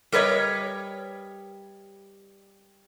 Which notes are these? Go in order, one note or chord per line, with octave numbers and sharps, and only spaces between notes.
G3 A#4 B4 C#5 D#5